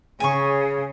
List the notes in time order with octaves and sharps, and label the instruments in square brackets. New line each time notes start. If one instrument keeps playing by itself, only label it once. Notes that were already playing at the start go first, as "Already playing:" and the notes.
[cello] C#3 [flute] G#4 [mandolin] G#5 C#6